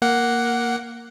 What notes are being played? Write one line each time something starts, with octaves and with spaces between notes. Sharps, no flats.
A#3 F#5